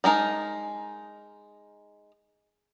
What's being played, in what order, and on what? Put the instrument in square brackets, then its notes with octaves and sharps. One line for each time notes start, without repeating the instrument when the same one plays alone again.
[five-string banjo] G3 G#3 D#4 A#4 A5